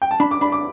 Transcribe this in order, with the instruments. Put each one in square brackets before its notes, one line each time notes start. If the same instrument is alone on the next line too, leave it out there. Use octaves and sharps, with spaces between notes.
[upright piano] G5
A5
[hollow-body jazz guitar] D4 [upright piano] B5
[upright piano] D6
[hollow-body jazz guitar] D4 [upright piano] B5
[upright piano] D6